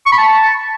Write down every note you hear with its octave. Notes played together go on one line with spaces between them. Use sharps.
C#6
B5
A5